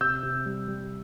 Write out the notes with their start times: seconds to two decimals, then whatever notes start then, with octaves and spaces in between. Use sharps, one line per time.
0.01 C3 E6 G6
0.23 C3
0.46 G3
0.68 G3